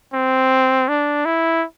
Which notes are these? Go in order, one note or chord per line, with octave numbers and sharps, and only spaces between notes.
C4
D4
E4